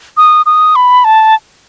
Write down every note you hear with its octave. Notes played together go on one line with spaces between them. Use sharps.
D#6
D#6
B5
A5